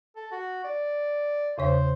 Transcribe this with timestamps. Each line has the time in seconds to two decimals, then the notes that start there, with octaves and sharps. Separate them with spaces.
0.16 A4
0.32 F#4
0.64 D5
1.58 E2 C#3 C5 C#5